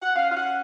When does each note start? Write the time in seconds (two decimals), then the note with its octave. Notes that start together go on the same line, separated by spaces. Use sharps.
0.03 F#5
0.16 C#4 F5
0.31 F5
0.37 F#5